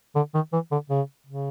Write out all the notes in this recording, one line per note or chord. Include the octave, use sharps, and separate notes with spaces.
D3
D#3
E3
D3
C#3
C#3